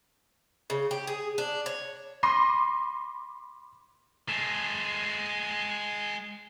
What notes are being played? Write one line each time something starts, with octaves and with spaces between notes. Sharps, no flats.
C#3
G4
G#4
D4
C#5
B5 C6 D6 A#6 C7 D#7
G#3 A4